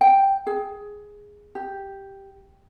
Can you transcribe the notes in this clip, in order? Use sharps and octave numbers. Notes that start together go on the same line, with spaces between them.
G5
G#4
G4